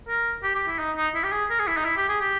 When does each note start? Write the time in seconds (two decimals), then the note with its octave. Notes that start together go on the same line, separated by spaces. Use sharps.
0.08 A#4
0.43 G4
0.55 G4
0.67 E4
0.79 D#4
0.96 D#4
1.15 E4
1.24 G4
1.32 G#4
1.50 A#4
1.59 G#4
1.67 E4
1.77 D#4
1.85 E4
1.97 G4
2.09 G#4
2.21 G4